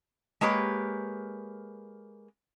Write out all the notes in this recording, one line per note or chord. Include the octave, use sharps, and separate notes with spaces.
G#3 A#3 G4 B4 C#5